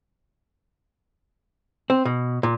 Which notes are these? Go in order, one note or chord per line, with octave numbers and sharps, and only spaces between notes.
C4
B2
A#2